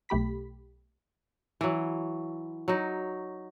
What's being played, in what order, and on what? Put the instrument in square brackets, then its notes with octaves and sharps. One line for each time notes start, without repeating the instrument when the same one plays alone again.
[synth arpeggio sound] B1 A3 G4 B5 B6
[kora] E3 F#3
F#3 D#4